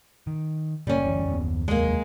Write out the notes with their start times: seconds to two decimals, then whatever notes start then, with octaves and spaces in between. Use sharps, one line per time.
0.27 D#3
0.87 F#1 C#3 G3 A#3 C#4
1.04 F#1 D2 E3
1.27 F#1 D#2 B3
1.68 F1 D#2 F#3 G#3 A#3